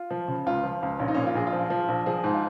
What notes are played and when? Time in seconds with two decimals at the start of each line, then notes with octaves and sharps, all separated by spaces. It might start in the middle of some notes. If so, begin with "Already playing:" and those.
Already playing: F4
0.11 F3
0.28 C#3
0.46 C#2 F4
0.63 F3
0.82 C#2
1.00 A#1 C#4
1.08 D#4
1.14 A#2 C#4
1.27 F4
1.35 A#1 G#4
1.47 F4
1.53 F3
1.70 F3
1.88 A#1
2.06 F3 G#4
2.24 G#2
2.34 F4